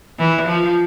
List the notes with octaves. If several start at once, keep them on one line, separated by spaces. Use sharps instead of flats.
E3
F3